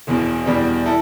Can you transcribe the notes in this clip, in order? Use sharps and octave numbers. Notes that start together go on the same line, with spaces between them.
E1 E2 B2
E2 B2 G3 D4
E4 A4